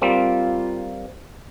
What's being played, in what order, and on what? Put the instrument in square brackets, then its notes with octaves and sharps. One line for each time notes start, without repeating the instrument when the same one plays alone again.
[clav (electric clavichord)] G3 A#3 C4 [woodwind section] F4